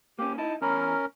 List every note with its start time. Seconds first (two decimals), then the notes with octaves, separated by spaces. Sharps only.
0.19 A#3 C#4 G4
0.38 D#4 E4 A5
0.62 E2 C#4 A#4 A#5 B5